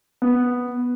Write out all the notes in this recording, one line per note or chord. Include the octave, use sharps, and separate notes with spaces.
B3